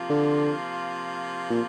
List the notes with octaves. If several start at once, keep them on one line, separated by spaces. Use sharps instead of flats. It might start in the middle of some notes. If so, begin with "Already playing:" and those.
Already playing: C3 F3 A#3 F4
D3
A#2